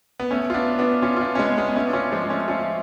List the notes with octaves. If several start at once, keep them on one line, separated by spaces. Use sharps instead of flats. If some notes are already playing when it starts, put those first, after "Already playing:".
B3
A3 C#4
F4
B3 D4
B3 D4
C#4 F4
F4
B3 D4
C#4
G#3 B3
G#3 B3
A3 C#4
D4
C#4 F4
F3 G#3
A3 C#4
C#4 F4